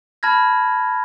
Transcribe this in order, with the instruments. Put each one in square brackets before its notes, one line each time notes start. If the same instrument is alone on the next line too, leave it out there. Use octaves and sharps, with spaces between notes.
[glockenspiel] A5 B5 F6 G#6 A#6